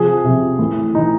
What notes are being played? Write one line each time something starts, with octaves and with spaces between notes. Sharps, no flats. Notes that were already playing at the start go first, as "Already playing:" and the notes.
Already playing: C3 F3 G#4
C3 F3
A2 E3
A2 E3 D#4